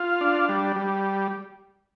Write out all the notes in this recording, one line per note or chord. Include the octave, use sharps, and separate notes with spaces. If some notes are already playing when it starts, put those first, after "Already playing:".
Already playing: F4
D4
G3
G3